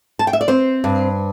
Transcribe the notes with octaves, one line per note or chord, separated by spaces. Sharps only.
A5
G5
E5
D5
C4 C5
G2